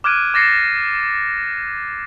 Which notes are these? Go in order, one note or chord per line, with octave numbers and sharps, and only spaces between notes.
D6 F6 F#6 G#6 D7 D#7
D6 A6 A#6 C7 C#7 E7